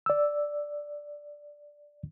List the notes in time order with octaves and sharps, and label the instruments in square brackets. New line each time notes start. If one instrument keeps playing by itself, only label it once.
[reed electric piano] D5 E6